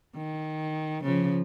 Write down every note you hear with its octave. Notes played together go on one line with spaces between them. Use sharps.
D#3
C#3 F3